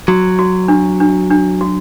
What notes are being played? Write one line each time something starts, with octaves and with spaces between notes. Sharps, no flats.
F#3 F#4
F#4
D4
D4
D4
F#4